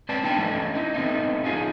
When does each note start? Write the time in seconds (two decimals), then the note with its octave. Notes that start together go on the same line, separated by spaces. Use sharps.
0.09 C4 B4 D5 A5
0.23 B3 D4 D#4 B4 G5 A5
0.39 A3 C#4 D4 A4 D#5
0.75 D#4 E4
0.94 A3 B3 C4 D#4
1.44 D#4 F4 G#4